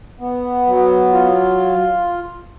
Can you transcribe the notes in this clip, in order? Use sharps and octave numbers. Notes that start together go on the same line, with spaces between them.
B3
F#3
F4